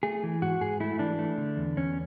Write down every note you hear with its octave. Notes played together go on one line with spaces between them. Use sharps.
A3 G#4
E3
G#2 F#4
G#2 G#4
A3 E4
E3 D4
A3
D3
E2
E2 C#4